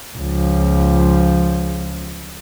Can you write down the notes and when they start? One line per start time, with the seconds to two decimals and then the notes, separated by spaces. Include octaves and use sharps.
0.17 C#2 F3